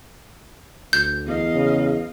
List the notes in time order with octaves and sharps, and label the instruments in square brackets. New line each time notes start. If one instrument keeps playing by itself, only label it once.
[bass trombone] D2 [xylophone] G6
[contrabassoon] E2 [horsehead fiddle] D#5 F5
[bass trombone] C#3